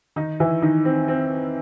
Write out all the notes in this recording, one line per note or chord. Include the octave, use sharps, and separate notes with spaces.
D#3 D#4
E3 E4
D#3 D#4
C4
C4